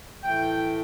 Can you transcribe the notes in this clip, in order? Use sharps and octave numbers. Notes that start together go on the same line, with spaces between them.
A2 E3 A3 G5